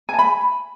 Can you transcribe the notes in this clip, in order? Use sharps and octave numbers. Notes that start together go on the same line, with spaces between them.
G#5 A5 B5